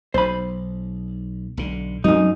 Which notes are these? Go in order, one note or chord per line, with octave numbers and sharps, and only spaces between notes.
B1 C5 B5
B1 D3
F#2 F#3 A3 C4 D#4